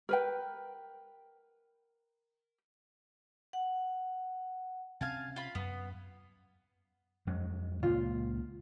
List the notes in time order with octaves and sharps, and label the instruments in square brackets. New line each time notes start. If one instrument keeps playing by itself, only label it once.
[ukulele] A#4 B4 G5
[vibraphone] F#5
[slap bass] C3 C4 C#4 [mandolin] F5 G#5 A5
[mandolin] F4 B5
[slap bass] F#2 [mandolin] B3
[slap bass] F2 F#3 G#3
[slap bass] C#2 A#2 [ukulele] F4